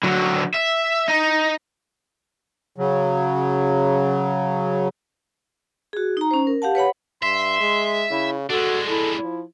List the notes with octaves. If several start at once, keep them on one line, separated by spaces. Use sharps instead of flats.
D3 F#3
E5
D#4
C#3 F#3
F#4 G#4
D#4 A#5
C#4 C5
A#4
G4 F5 F#5 A5
B4 C#5 F#5 B5
G2 E5 C6
G#3
C#3 E4
G#3 D4 F#4 A4
E4 A4
F3